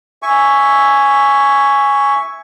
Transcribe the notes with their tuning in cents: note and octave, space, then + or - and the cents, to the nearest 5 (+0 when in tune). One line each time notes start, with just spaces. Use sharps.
E5 +0 G#5 +0 C#6 +10